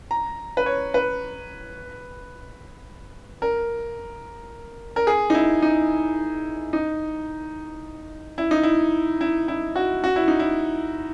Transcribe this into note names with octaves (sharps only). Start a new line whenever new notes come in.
A#5
B4
C#5
B4
A#4
A#4
G#4
D#4
E4
D#4
D#4
E4
D#4
E4
E4
E4
F#4
F#4
E4
D#4
E4